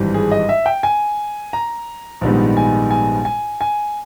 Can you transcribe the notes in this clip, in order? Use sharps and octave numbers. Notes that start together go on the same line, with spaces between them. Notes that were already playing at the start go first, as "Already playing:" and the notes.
Already playing: G#1 G2 E3 G3
G#4
D#5
E5
G5
G#5
A#5
A#1 G#2 D#3 G3 B3
G#5
G#5
G#5
G#5